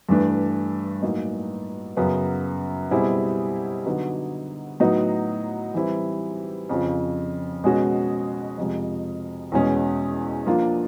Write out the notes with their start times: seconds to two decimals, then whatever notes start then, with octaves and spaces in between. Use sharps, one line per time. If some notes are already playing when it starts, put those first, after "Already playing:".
0.09 G2 E3 A3 D4
1.02 A2 F#3 A#3 D#4
1.97 F#2 C#3 F#3 B3
2.91 B2 G3 C4 E4 G#4
3.86 D3 F#3 B3 D#4 F#4
4.80 A2 F#3 B3 D#4
5.74 E3 G3 C4 E4
6.69 F2 C#3 F3
7.64 B2 G#3 C#4 F#4
8.58 F2 C3 F3 G#3
9.52 E2 B2 G#3 C#4
10.47 F3 A#3 D4 F4